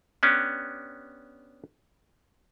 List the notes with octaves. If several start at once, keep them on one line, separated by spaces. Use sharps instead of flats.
B3 C#4 D4 G4